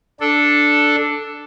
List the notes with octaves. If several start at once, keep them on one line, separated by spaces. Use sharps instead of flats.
D4 A4